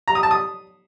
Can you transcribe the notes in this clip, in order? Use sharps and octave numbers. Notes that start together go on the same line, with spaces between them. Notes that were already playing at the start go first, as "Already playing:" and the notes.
A#5
D#6
A5
D#6